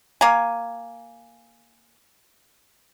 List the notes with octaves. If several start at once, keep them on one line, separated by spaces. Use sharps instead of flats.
A#3 G#5